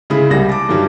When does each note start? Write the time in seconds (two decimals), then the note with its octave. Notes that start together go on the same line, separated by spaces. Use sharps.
0.10 C#3 G#3 E4 G#4 B5
0.30 C2 G3 A#6
0.49 A5 D6
0.69 G2 D#3 F#3 G3